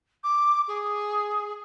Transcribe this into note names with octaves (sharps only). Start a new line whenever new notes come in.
D6
G#4